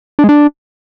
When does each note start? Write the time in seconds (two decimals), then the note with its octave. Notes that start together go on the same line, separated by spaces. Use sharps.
0.19 D4
0.24 G#3
0.29 D4